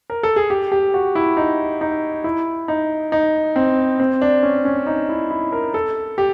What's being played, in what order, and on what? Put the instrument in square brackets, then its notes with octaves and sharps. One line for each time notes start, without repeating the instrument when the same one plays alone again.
[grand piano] A#4
A4
G#4
G4
G4
F#4
E4
D#4
D#4
E4
D#4
D#4
C4
C4
D4
C#4
C#4
D#4
E4
E4
A#4
A4
G4